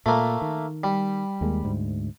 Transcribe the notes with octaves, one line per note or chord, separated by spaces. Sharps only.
A#2 A3 A#3
D#3
G3
D#2 G#3 A#3
D2 G#2